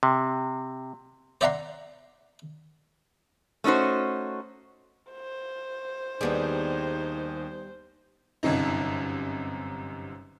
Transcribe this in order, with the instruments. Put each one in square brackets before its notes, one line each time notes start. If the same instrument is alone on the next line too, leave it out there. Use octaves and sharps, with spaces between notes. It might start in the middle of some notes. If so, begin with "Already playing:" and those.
[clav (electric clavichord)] C3
[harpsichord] C5 D5 E5 F#5 A#5 C6
[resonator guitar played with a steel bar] A3 C#4 D#4 F#4 C5
[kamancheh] C5
[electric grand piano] D#2 G#4 [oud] G3 B3 D4 [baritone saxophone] D#4
[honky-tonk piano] G1 F#2 C3 D#4